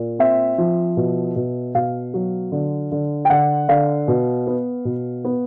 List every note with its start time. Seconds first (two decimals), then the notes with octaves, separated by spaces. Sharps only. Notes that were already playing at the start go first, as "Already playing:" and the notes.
Already playing: A#2
0.19 C4 E5
0.58 F3
0.97 B2
1.36 B2
1.75 B2 F5
2.14 F#3
2.52 D3
2.92 D3
3.25 G5
3.30 D3 F#5
3.68 D3 F5
4.08 B2
4.47 B3
4.85 B2
5.24 B3